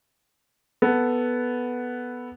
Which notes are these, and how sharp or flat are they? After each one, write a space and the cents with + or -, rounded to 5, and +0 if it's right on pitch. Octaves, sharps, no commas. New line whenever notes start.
B3 +0 A4 +0